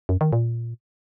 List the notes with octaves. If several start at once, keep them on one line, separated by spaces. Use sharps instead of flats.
F#2
D#3
A#2